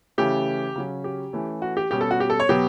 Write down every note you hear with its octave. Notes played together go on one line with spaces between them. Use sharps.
C#3 E3 A3 C#4 G4
C#3 F#3 C#4
G4
E3 A3 C#4
F#4
G4
B2 G3 C#4 G4
A4
F#4
G4
A4
C#5
B2 F#3 B3 G4